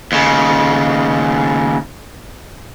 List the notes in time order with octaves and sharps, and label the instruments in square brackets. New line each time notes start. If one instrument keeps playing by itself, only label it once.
[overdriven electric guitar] D#2 C#3